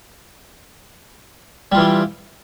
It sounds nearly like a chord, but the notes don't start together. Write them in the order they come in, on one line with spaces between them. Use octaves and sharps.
G3 F4 E3 G4